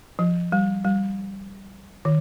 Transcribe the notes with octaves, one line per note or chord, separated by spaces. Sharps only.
F3
G3
G3
D#3